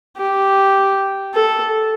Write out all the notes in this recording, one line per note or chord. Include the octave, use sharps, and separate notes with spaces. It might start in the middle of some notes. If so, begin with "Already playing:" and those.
G4
A4